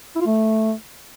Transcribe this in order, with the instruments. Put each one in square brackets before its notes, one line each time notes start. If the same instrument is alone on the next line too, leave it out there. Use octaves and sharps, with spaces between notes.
[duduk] E4
F4
A3